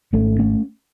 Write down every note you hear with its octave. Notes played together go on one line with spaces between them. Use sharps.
G#1 G#2 A3 C#4
A3 C#4